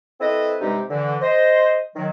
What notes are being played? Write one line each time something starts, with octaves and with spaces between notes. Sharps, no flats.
C4 E4 A4 B4 D#5
G2 C3 G#3 D#4 G4
D3 E3
C5 D#5
D#3 F#3